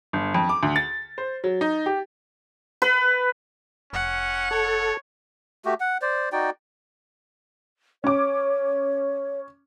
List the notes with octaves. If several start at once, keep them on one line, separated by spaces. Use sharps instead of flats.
G1
F2
D6
D2
A6
C5
F#3
D#4
G4
B4
F1 C#4 F#5
A4 C#5
A3 F#4 G4
F#5
C5 D5
D#4 F#4 D5 G5
C#4 C#5 D6